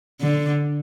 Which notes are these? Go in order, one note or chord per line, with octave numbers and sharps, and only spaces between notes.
D3